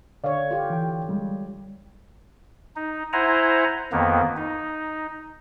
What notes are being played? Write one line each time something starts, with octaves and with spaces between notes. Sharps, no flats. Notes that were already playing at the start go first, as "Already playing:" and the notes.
D3 C#5 D5 F5
F4 G4
E3 G5
G3 G#3
D#4
E4 C5 F#5 G#5 A#5
F2 D#3 A#3 B3
D#4